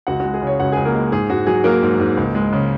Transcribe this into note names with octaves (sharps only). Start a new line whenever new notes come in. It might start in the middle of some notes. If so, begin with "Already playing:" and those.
C#2 F#4 F#5
G#3 F#4
G#4
C#3
C#4 C#5
C#2 F#4 F#5
C#2 G#4 G#5
A#3 A#4
G#3
G#2 G#4
G#2 F#4
F#3 G#4
F#3 A#3 A#4
G#2
G#2
C#2
G#3
C#3